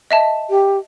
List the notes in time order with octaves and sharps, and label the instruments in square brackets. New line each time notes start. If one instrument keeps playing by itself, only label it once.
[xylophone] D#5 E5 A5
[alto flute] G4